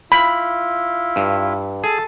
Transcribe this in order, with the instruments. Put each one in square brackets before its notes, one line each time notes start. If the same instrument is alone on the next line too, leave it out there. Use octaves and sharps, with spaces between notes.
[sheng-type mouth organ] E4 F4 [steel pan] B5
[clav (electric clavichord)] G2
[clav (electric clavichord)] G#4 [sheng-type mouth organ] A4 A5